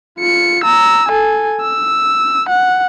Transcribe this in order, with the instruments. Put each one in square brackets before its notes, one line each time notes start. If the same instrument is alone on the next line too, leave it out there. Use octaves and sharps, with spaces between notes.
[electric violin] F4 C#7
A#5 E6
A4 G#5
E6
F#5